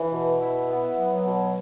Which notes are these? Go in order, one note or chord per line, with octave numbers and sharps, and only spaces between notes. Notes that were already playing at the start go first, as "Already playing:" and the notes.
Already playing: E3
B2
E4
B3
F#3
B2